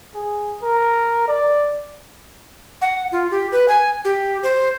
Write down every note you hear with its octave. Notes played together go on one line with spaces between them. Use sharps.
G#4
A#4
D5
F#5
F4
G4
B4
G#5
G4
C5